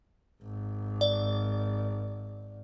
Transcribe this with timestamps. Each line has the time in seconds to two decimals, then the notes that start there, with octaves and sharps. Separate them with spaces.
0.42 G#1
1.01 D5